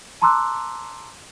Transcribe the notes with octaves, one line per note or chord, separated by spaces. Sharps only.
A5 A#5 C6 D6 E6 F#6